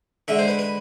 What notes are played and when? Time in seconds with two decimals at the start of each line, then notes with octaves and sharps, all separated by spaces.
0.28 D3 G#3 E5
0.39 C5
0.48 B4
0.59 B4